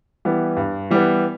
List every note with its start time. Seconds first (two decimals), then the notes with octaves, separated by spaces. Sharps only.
0.25 E3 G3 B3
0.57 G2
0.91 E3 G3 B3